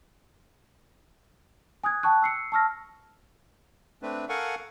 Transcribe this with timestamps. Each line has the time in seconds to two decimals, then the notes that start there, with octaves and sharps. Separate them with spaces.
1.84 G#5 D#6 F#6 G#6
2.03 G5 A5 C#6 F#6
2.22 E6 C7 C#7
2.52 A5 C#6 E6 F6 A#6
4.02 A3 C4 D4 B4
4.29 A4 A#4 F5 F#5 G#5 C#6